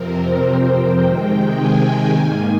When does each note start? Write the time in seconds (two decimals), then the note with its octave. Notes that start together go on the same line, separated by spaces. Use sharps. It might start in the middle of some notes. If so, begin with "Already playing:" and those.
Already playing: F2 C3 F3 C4 A#4
0.18 C5
0.46 G5
1.03 C3 D#3 G#3
1.60 G#5
2.16 G#2 D#3 A#3